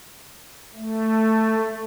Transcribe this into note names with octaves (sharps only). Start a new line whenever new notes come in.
A3